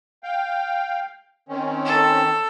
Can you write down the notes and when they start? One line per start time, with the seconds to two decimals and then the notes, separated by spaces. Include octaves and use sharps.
0.23 F5 G5
1.49 D#3 C4 C#4
1.85 A4